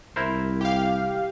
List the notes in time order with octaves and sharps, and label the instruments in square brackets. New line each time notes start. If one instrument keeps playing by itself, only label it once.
[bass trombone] C2 [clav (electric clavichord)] E4 A#4 C5
[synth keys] G4 F5